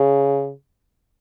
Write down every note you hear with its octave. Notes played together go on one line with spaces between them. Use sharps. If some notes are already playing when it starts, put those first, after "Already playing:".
Already playing: C#3